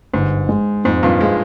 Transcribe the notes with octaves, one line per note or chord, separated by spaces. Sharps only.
G1 G#2
G#3
F2 G#2
G2 A#2
F3 G#3